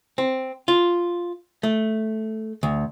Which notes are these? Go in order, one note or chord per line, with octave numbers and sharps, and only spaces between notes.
C4
F4
A3
D2